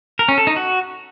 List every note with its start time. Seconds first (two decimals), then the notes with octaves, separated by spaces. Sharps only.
0.19 A#4
0.29 C#4
0.38 A4
0.47 D#4
0.56 F#4